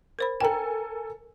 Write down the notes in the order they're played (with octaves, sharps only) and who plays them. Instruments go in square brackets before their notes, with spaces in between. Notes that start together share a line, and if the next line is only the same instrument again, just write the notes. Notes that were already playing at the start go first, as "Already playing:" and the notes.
[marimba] A#4 C5 B5
[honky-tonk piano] A4 A#4 G#5 [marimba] G5 A#5